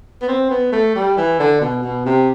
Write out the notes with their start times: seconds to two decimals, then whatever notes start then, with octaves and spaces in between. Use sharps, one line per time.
0.21 B3
0.28 C4
0.50 B3
0.72 A3
0.95 G3
1.17 E3
1.39 D3
1.61 B2
1.83 B2
2.05 C3